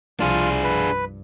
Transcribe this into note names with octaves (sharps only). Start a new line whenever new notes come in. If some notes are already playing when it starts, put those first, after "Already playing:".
C2 F3 D4 F4 G#4
G2 B4